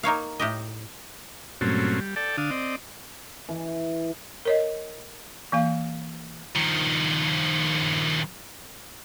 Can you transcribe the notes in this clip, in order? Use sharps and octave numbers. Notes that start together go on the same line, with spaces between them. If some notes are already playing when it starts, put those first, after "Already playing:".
A#3 D#4 C#5 F5
A2 G4 D#5
G2 A#2 F#3 A3 C4 C#4
G3
A4 D5 G5 A5
D3 D4 F5 D#6
C4 D5 D#5
E3
A#4 C#5 D#5
E3 A#3 F5
D#3 F3